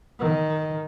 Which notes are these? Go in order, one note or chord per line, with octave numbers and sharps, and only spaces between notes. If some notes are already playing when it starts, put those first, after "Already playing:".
D#3